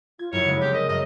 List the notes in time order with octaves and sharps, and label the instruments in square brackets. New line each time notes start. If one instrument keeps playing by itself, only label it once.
[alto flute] F4 [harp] G#6
[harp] F1 F#2 [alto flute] E4 [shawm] C#5
[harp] C#3 G#3
[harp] C4 [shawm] G4
[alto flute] A#4 [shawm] D#5
[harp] F#2 [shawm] D#5